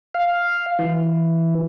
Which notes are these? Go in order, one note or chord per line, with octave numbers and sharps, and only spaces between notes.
F5
E3